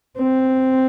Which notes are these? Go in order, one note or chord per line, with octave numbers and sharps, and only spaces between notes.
C4